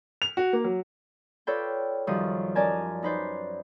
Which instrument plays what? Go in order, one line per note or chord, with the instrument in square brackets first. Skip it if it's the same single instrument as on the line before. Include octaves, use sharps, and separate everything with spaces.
[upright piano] F7
F#4
A#3
F#3
[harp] F4 A4 B4 C#5 D5 G5
F#2 D#3 F3 G3 C#6 D#6
C#4 A#4 D5 D#5 G#5 A5
D#4 B4 C5 D5